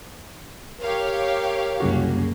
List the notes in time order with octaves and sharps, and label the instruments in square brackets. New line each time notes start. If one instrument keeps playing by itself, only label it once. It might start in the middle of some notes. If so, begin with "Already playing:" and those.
[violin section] G4 C#5 F5 [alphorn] A#4
[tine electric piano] C2 C#3 F#4 [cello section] F#2 A#3 C#4